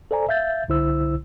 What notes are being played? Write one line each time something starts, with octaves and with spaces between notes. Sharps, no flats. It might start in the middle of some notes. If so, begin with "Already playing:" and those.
A4 C5 D5 G#5 A#5
E5 F5 G6 A6
C2 D3 E4 C5 E6